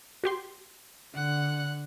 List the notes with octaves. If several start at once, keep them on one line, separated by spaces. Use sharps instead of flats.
F#4 G4 C6
D3 F#5 F#6